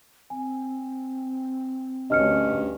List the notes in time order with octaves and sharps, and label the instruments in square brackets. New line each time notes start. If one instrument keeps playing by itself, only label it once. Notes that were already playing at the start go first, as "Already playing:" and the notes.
[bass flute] C4 [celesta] G#5
[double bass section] D2 C#4 [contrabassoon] G2 [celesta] D#5 F6 C#7